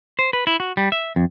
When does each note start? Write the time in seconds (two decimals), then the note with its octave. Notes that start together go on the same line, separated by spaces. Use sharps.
0.19 C5
0.33 B4
0.47 E4
0.60 F#4
0.77 G3
0.92 E5
1.16 F2